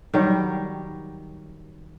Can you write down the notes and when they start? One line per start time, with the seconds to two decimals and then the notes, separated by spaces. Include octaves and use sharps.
0.14 D#3 F#3 G3